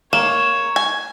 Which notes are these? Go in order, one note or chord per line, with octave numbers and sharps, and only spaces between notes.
A#3 C#5 E7
G#5